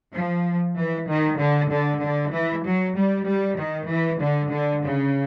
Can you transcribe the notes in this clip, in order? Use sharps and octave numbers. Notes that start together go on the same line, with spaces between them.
F3
E3
D#3
D3
D3
D3
E3
F#3
G3
G3
D#3
E3
D3
D3
C#3